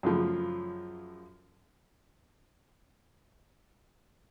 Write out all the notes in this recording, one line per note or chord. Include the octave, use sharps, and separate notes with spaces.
F#2 C#3 F3 A3